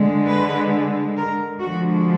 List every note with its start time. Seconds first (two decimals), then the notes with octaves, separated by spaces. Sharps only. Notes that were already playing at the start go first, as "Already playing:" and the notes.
Already playing: D3 G#3
0.29 B4
1.16 A#4
1.60 D3 F3 G#3 F#4